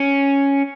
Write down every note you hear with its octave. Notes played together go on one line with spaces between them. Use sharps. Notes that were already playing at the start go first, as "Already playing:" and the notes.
Already playing: C#4